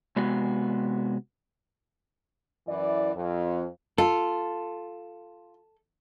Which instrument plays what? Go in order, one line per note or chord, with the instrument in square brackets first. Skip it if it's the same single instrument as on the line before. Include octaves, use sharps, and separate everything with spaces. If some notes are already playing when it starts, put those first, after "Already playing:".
[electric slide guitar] C3 G#3 B3 F#4
[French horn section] F#2 E3 E4 D5
F2
[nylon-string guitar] F4 [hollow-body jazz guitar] A4